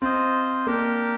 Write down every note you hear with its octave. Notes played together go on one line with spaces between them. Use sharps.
C4 F4 C5 D#5
A#3 D4 G4 A#4